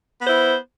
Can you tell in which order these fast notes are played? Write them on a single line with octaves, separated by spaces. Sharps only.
B3 C5 E4